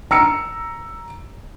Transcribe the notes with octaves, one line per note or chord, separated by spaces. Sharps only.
A#5 E6 C#7